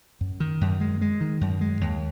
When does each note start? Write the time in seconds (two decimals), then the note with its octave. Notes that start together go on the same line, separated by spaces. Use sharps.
0.21 F#2
0.40 D#3
0.61 F#2
0.81 G#3
1.01 G#3
1.21 D#3
1.41 F#2
1.61 G#3
1.81 D#2